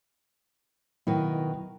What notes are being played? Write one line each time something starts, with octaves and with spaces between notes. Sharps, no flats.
B2 D#3 F#3 E4